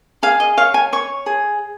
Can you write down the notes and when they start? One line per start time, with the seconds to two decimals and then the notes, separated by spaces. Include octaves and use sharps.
0.23 G#4 F5
0.40 D#5
0.57 C#5 F5
0.74 G#5
0.93 C#5 C#6
1.26 G#4